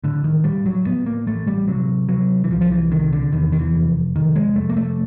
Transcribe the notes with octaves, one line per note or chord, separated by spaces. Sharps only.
A2 D3
D#3
A2 G3
F#3
A2 B3
A#3
A1 A3
G3
C3 F#3
C3 F#3
E3
C2 F3
F3
E3
C3 D#3
D3
E2 D#3
D#3
E3
F1
F1 D#3
G#3
F1 A3
A#3
A3